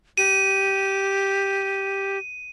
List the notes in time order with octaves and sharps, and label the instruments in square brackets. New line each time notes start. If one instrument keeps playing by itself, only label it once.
[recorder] G4 [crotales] D#7